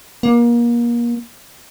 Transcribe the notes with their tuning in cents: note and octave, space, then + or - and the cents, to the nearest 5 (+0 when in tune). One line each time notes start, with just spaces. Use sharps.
A#3 +30